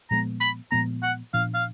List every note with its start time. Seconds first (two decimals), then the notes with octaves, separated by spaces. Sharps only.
0.10 A#2 F3 G#3 B3 A#5
0.41 B5
0.71 A#2 F3 G#3 B3 A#5
1.03 F#5
1.33 A#2 F3 B3 D4 F5
1.54 F5